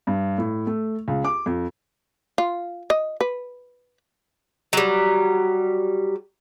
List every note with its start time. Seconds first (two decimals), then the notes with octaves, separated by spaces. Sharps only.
0.07 G2
0.38 A2
0.67 A3
1.08 C#2
1.24 D6
1.46 F2
2.38 F4
2.90 D#5
3.21 B4
4.73 F#3 G3